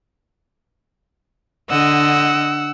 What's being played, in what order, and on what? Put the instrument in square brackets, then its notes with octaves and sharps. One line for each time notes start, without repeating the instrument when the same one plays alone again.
[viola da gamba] D3 D#5 [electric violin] F#5 E6